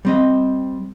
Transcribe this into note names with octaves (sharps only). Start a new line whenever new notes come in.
G3 C4 D#5